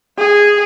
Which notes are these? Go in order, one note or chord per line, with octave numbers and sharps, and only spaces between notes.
G#4